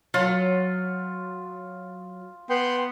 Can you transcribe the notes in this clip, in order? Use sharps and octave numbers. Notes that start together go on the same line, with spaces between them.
F#3 F4
B3 G5 C6